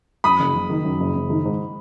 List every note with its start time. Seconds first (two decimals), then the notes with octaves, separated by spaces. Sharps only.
0.24 F#2 B5 D#6
0.40 F#1
0.55 F#1
0.70 D#3
0.84 F#2
1.00 F#1
1.15 F#1
1.30 D#3
1.45 G#2